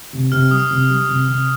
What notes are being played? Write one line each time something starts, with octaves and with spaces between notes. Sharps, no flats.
C3
C3 F6
G3 D#6
C3
G3
C3
C3